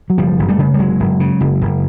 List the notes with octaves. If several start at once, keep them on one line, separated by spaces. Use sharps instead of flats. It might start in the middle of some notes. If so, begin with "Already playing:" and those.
F#3
F#1 F3 G3
F#1
G3 A3
C#3
G3
F#1 F#3 G#3
F#1
C#3
F#1
F#1